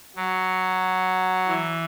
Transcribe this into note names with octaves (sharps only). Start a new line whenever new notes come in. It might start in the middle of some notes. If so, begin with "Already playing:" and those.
F#3
E3